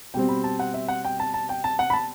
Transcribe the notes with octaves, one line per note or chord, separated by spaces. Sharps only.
B2 G3 C4 G5
B5
A5
F#5
E5
F#5
G5
A5
A5
G5
A5
F#5
B5
A5